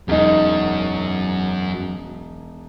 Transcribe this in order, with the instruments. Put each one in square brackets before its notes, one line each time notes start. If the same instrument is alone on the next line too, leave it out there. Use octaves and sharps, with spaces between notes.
[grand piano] E1 D#4 [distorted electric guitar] F#2